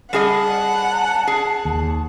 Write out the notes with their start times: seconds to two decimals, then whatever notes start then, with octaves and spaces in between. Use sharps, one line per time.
0.13 G3 G#4 D#5 F#5 A5
1.27 G#4
1.65 D#2